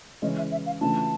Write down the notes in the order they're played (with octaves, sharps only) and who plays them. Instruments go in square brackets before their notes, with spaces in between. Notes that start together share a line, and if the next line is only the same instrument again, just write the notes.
[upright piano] C#3 E3 G#3 C#4 [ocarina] D#5
[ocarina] E5
E5
F5
[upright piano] C#3 E3 A3 D4 F4 [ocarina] A5